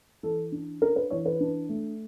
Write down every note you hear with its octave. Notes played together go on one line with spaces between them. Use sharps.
E3 A4
D4
D4 A#4
B4
E3 C#5
B4
D4
A3